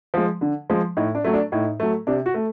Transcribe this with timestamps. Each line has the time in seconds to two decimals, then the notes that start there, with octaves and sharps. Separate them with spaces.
0.14 F3 G#3
0.41 D3
0.70 F3 G#3
0.97 A2 D#4
1.15 D4
1.24 F#3 A3
1.34 D4
1.52 A2 D#4
1.80 F#3 A3
2.07 C3 D4
2.26 F#4
2.34 A3